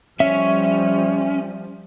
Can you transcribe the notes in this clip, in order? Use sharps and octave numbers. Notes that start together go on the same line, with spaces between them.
F3 G3 C#4 E5